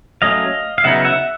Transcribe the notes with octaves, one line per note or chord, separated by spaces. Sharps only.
F#3 A3 C#4 D#5 F5
F5
C#3 F#3 B3 D#4 E5 F#5
E5 F#5